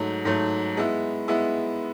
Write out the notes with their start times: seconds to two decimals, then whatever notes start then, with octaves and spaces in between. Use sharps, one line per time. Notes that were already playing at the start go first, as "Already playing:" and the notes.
Already playing: G#2 F#3 A3
0.25 G#2 F#3 A3
0.77 G#3 B3 E4
1.28 G#3 B3 E4